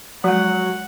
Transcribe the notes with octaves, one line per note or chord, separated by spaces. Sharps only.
F3 F#3 G#3 F#5